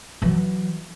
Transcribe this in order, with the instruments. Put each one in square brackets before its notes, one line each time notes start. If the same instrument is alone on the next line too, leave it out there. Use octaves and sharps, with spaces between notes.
[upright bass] E3 F#3